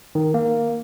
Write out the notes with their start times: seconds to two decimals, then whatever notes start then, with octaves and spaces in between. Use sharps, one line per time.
0.15 D#3
0.34 A#3